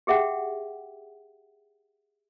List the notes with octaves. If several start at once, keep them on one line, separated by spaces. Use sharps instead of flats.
G4 G#4 E5 F#5 G5